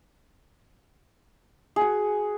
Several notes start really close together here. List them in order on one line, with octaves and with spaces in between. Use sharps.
G#4 F#5 F#4